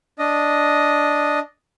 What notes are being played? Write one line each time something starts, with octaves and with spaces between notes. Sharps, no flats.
D4 D#5